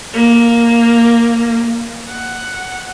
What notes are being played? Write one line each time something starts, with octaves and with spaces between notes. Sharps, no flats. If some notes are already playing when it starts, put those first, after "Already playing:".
A#3
F#5